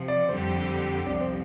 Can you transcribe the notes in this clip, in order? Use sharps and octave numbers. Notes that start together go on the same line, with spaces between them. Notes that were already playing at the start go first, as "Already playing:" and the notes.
Already playing: C3 F3
D5
F2 D3 G3 C4 G4 C5
C2 C3 F3 D4
C4